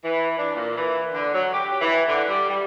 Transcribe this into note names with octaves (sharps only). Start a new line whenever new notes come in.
E3
D4
A#2
E3
D3
F#3
G4
E3
D3
G3
G3